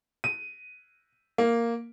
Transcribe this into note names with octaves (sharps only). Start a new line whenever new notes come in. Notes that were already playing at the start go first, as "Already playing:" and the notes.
D#7
A#3